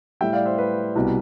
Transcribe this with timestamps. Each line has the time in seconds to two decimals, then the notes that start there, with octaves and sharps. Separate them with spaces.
0.21 A2 G3 E5 G5
0.33 D5 F5
0.45 C5 E5
0.58 B4 D5
0.95 C2 B2 G3